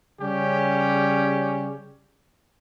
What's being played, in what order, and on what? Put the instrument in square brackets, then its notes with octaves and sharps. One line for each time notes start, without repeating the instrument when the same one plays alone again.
[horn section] C#3 G3 C#4 G4